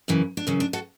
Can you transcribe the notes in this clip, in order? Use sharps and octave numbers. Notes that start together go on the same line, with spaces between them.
F#2 C#3 E3
D4
F#2 C#3 E3 C#4
D4
F#4 A4